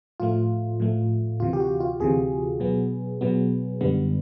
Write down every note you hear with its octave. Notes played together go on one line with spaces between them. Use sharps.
A2 F3 A3 F4
A2 F3 A3
D2 C3 E3 F4
G4
F#4
F4
D2 C3 E3 G#4
B2 F#3 B3
B2 F#3 B3
F#2 D3 G3 B3